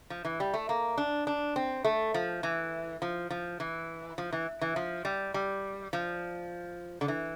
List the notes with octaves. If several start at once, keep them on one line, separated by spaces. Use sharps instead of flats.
F3
E3
G3
A3
A#3
D4
D4
C4
A3
F3
E3
F3
F3
E3
F3
E3
E3
F3
G3
G3
F3
D3
E3